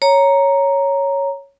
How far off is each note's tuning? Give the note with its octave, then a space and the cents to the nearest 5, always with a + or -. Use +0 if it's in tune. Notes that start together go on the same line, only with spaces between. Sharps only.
C#5 +0 A#5 +0